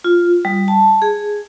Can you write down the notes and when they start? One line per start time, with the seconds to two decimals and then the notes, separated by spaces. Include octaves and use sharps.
0.04 F4
0.45 G3
0.68 A5
1.02 G#4